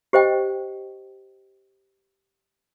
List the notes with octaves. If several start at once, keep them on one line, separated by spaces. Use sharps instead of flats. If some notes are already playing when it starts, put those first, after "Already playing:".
G4 C5 D#5 G5